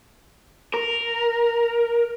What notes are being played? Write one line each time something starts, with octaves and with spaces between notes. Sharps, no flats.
A#4